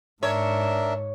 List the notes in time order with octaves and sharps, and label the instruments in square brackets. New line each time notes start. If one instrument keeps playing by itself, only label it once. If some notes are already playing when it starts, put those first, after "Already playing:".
[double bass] G#2 [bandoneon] D4 A#4 E5 [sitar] C#5